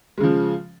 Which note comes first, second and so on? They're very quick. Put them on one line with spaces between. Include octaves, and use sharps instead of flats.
G#3 C#3 F3